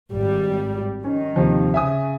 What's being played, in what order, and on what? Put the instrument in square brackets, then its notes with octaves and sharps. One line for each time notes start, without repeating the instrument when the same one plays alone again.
[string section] G#1 G3
[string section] D#3 [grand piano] C#4
[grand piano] D#2 C3 F3
[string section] C#3 [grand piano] E5 G#5 D#6